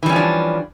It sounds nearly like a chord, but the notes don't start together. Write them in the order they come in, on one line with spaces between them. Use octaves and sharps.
E3 G3 C#4 F3 D4